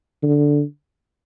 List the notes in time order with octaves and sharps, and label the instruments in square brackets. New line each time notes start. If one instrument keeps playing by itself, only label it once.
[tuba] D3